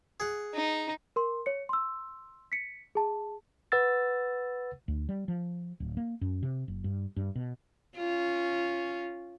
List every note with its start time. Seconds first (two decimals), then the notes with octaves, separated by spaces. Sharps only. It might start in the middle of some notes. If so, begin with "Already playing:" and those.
0.20 G#4 F#5
0.54 D#4
1.16 A#4 C6
1.46 C#5 C#7
1.69 C6 E6
2.52 B6 C#7
2.95 G#4 A5
3.72 B4 F#5 E6 A6
4.88 D2
5.09 G3
5.28 F3
5.80 D1
5.97 A#3
6.21 F#2
6.43 C3
6.68 F#1
6.84 G2
7.16 G2
7.36 B2
7.97 C#4 F4